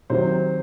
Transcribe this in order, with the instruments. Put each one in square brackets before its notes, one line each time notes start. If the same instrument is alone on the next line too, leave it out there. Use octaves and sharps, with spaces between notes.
[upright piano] C3 D#3 F#3 [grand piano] C5